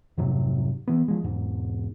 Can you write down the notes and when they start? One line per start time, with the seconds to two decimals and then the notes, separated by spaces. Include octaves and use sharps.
0.18 F2 G#2 C3 F#3
0.88 E3 B3
1.08 F3 G#3
1.24 E1 G#2